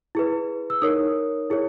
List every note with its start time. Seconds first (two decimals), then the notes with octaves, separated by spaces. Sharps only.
0.15 E4 G#4 B4
0.70 E6
0.82 D#4 A#4 C#5 D#6
1.50 E4 G#4 C#5